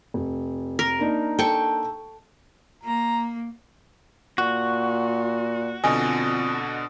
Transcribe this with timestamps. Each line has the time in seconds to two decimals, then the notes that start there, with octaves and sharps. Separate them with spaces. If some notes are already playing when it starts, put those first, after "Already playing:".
0.14 F1
0.79 A#4
0.99 A#3 D4 D#4
1.39 A4 G5 C#6
2.84 A#3 A#5
4.38 A#2 F#4
5.84 F2 B2 D3 D#5 G#5 D#6